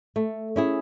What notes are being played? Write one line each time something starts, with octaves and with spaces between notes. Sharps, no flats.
A3
C#4 E4 G#4